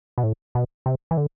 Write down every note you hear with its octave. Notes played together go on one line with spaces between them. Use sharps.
B2
A2
B2
C3
E3
D3